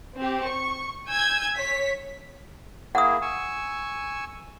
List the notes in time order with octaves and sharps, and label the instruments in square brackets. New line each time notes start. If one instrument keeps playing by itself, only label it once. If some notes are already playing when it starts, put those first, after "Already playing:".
[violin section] C4 G4
C#6
G#5 E6 G6 G#6
C#5 B6
[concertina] A#3 E4 G#4 [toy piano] F#5 D#6
[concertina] G#5 C#6 E6